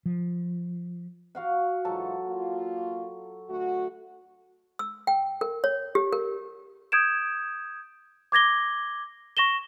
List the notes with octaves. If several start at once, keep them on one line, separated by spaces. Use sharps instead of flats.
F3
F#4 F5 F#5
G#2 E3 F#3 F4 A4 A5
A#3 F4
D2 A3 F#4
E6
G5
A#4
C#5
G4
A#4
D#6 G6 G#6 D7 E7
D6 G#6 A#6 G7
C#6 A#6 E7 G7